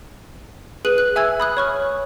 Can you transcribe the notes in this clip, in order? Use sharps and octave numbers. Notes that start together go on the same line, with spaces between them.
G#4 B4 F#6 D#7 F#7
F#6
E5 G#5 E6 G#6
B5 D#6 F#6
C#5 C#6 F6